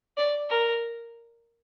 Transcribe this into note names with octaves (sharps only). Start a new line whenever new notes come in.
D5
A#4